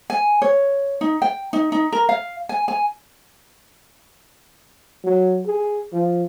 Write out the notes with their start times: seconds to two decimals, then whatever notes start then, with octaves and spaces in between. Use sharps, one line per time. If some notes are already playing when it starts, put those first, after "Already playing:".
0.10 G#5
0.42 C#5
1.01 D#4
1.22 G5
1.53 D#4
1.72 D#4
1.92 A#4
2.09 F5
2.49 G#5
2.68 G#5
5.04 F#3
5.46 G#4
5.92 F3